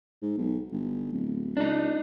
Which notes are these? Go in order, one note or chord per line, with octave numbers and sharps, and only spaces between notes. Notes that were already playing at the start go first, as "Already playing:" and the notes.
G#2
B1
G1
D1
C#2 D4 D#4